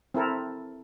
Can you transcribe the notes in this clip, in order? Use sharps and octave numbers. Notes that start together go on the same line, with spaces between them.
C4 E4 A4 A#4